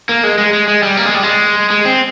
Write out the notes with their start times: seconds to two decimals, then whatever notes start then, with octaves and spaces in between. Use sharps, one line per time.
0.09 A#3
0.23 G#3
0.38 G#3
0.53 G#3
0.68 G#3
0.83 G3
0.97 A#3
1.06 G#3
1.15 G3
1.23 G#3
1.71 G#3
1.85 C4